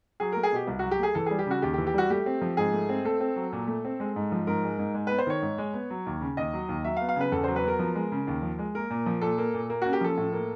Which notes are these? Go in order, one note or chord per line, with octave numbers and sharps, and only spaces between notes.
F#3 G#4
A3 A#4
G#4
B2 G4
C2
F#3 F#4
G4
A3 G#4
E3 A4
G3 G#4
G4
C#3 F#4
D#2 G4
G4
E3
G4
G3 F#4
A3 G4
C4
F3
G#2 G#4
A3
C4
A3 A4
C4
F#3
A#2
A3
C4
G#3
G#2
F3
G#2 A#4
G#3
G#2
G#3
B3 B4
C5
D#3 C#5
G#2
G#3
B3
F#3
D#2
C#3
D#2 D#5
F#3
D#2
F#3 E5
F5
B3
F5
C#3 B4
E2 A4
F#3 C5
B4
B3 A#4
F3
G#3
C#3
D#2
F3
G#3
A#3 A#4
A#2
F3
A#2 A4
A#3
A#2
A#3
C#4 F#4
G4
F3 A4
A2
A#3